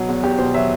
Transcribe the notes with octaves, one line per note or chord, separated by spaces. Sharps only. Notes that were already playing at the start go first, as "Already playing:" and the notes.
Already playing: B2 F#3 F#4
E2
E2 G4
B2 C5
F#3 E5